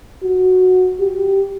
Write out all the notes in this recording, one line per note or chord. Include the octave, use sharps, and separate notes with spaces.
F#4
G4